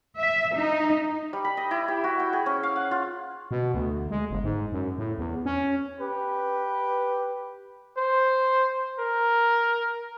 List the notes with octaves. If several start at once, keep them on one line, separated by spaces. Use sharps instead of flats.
E5
D#4
G3
B5
D#5
E4
G4
F#4
G5
G#4
C#4
F5
F#5
F4
B2
D2
G#3
G1
G#2
F#2
A2
E2
C#4
G4 B4
C5
A#4